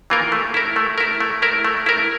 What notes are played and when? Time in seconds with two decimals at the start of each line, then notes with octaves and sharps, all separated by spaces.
0.10 E3 A#3 F4 A#4
0.32 A3
0.54 E4 A#4
0.76 A3
0.98 E4 A#4
1.21 A3
1.42 E4 A#4
1.65 A3
1.86 E4 A#4